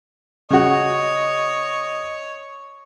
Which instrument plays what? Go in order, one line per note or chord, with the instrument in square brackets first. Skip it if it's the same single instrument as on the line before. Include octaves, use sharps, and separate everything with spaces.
[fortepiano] C#3 F#4 [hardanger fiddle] C#5 [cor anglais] D#5